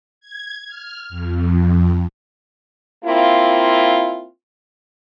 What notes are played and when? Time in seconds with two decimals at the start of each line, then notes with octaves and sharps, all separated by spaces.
0.20 G#6
0.68 F6
1.09 F2
3.05 A#3 C4 E4 F4